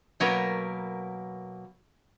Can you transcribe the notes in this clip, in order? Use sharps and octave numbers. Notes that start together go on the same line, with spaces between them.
B2 F#3 A#3 A#4 B4